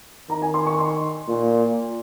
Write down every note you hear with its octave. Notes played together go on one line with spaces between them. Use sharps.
D#3 A#5
G#5
C6
C#6
C6
A#2